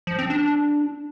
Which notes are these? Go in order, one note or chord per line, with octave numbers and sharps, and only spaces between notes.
F3
C4
D4